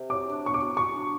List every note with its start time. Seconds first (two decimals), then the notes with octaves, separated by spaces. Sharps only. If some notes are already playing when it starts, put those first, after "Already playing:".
Already playing: C3
0.10 F#3 D6
0.27 D4
0.43 B3 C#6
0.54 D6
0.60 F#3
0.77 F#3 C#6
0.94 D4